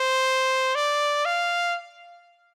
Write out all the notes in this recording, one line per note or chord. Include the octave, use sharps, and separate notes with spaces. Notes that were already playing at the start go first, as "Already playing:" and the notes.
Already playing: C5
D5
F5